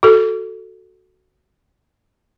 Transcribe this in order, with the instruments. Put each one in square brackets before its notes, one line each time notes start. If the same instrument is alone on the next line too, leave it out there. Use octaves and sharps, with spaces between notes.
[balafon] F#4 A4